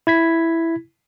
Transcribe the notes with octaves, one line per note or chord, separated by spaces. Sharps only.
E4 G#6 B6